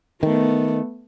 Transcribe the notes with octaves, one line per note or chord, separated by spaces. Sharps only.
D#3 A3 B3